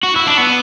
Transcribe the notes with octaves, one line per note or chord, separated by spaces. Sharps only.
F#4
E4
D4
B3